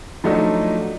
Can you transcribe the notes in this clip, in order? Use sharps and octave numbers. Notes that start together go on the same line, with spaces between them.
F3 F#3 A3 D4 D#4